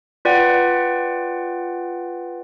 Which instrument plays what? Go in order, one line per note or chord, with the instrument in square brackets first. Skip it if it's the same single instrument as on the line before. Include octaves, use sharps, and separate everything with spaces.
[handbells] F4 B4 D5 F#5 G5